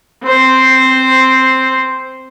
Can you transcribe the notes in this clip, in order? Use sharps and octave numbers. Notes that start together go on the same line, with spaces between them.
C4 C5